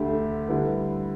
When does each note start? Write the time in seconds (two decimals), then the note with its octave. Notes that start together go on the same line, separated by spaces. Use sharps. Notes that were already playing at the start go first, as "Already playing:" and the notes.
Already playing: D2 D3 A3 G4 E5
0.48 D3 G3 E4 B4